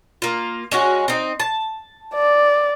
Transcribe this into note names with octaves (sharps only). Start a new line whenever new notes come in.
A#3 F4
G#3 C#4 F#4
C4 D#4
A5
D5